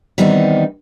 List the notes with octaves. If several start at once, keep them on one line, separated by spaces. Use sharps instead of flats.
D#3 E3 G3 B3 C4 D#4